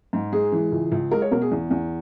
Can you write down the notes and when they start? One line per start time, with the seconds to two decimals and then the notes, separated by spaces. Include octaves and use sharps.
0.13 G#2
0.32 G#3 G#4
0.52 E3
0.72 C#2
0.92 C#2
1.11 G#3 A#4
1.22 C#5
1.31 B2 A#4
1.42 G#4
1.51 E2
1.71 E2